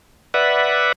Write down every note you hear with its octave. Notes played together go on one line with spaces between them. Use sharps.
B4 D5 E5 F#5